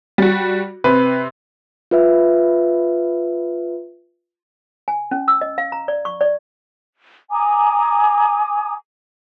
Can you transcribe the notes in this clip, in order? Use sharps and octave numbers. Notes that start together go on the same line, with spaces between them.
G3 F#4
C3 C4 B4
F4 B4 E5
G#5
C#4
E6
D#5
F5
A#5
D5
C#6
D5
G#5 A#5 D6 D#6